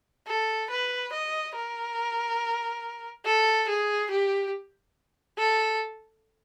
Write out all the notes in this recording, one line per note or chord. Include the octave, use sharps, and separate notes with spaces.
A4
B4
D#5
A#4
A4
G#4
G4
A4